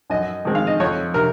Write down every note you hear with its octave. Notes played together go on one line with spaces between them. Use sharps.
F#2 D#5
D#3 G#3 C4
F5
D#5
F2 C#5
C3 A#4